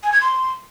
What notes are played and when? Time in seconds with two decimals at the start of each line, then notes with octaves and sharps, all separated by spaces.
0.03 G#5
0.12 G#6
0.21 C6